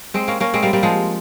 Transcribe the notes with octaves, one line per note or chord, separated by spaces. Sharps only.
G#3 C4
A#3 C#4
A#3 C#4
G#3 C4
G3 A#3
G3 A#3
F3 G#3